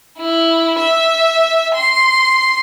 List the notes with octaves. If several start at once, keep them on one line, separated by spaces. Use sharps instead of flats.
E4
E5
C6